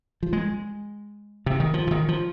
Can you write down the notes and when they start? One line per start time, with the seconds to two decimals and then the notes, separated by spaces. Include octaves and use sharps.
0.23 F3
0.33 G#3
1.46 C3
1.60 D#3
1.74 F3
1.87 C3
1.91 D#3
2.08 F3